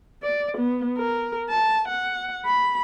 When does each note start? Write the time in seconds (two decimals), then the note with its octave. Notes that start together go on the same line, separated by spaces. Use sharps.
0.23 D5
0.58 B3
0.98 A#4
1.49 A5
1.88 F#5
2.46 B5